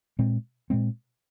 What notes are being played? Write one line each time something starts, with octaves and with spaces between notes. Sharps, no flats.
A#2 G#3 C4
A#2 G#3 C4